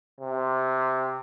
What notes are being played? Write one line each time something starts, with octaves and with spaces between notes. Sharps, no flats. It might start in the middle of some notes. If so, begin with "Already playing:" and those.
C3